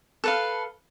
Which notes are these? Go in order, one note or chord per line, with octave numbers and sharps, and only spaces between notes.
A4 B4 F5